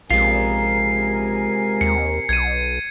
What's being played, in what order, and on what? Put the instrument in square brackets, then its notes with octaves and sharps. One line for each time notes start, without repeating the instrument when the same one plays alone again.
[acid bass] A#1 [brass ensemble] C3 A#4 G#5 [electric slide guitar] G#3 F4 [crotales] C7
[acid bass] D#2 [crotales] C#7
[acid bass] B1 [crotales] G#6 D#7